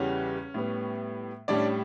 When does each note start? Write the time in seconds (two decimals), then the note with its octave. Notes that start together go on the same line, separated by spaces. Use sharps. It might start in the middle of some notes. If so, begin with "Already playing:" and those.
Already playing: E2 C#3 E3 G3 C#4
0.54 A2 G3 B3
1.48 A2 G3 C#4 D4 D5